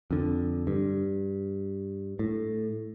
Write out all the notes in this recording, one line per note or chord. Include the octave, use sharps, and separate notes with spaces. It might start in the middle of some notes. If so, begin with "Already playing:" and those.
F2 D3
G2
A2